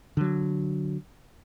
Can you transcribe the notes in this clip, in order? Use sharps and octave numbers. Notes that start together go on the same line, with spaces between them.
D3 F#3